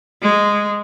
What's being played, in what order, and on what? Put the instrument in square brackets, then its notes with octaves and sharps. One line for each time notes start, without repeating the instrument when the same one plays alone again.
[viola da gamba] G#3